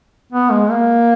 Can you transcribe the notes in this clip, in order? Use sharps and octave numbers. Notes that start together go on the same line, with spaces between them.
B3
G#3
A#3